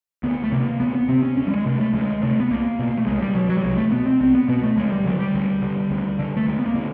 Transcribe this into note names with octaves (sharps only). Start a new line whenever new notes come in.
D2 B3
A3
C3 A#3
D2 B3
B3
C3 C4
C#4
D2 C#4
G3
G#3
C3 A3
A3
D2 G#3
C3 A3
B3
C2 A#3
B2
A3
C2 G#3
G3
B2 F#3
F#3
G3
C2 F#3
A3
B2 B3
C4
C2 C4
B3
B2 B3
A3
D2 G#3
G3
D3 F#3
G3
D2
D3
D2
D3
A3
D2 G#3
B3
A#3
D3